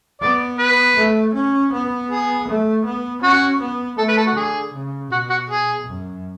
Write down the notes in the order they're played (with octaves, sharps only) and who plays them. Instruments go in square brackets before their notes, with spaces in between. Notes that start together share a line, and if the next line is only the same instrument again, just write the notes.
[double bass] B3 [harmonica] D5
[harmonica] B4
[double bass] A3
C#4
B3
[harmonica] G#4
[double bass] A3
B3
[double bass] C#4 [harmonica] F#4
[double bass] B3
[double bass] A3 [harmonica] A4
[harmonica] B4
A4
F#4
[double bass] D3 [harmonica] G#4
[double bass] C#3
[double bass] B2 [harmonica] F#4
[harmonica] F#4
G#4
[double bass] F#2